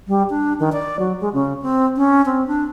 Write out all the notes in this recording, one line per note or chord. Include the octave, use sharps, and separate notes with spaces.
G3
D4
D#3
D5
F#3
G#3
C#3
C4
C#4
C4
D4